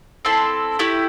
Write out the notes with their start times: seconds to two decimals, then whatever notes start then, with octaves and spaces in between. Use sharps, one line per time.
0.25 C4 E4 A4 A5 C6
0.79 A3 E4 G4